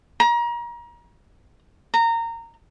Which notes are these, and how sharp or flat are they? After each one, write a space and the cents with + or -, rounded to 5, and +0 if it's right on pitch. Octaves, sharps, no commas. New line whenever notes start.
A#5 +30
A#5 -20